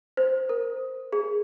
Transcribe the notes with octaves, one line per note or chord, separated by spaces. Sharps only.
C5
A#4
G#4